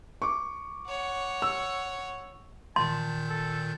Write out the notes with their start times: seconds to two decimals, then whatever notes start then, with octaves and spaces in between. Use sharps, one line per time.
0.22 C#6 D6
0.88 C#5 F#5
1.42 E6
2.76 A#2 D#3 A5 C6 G6
3.30 A4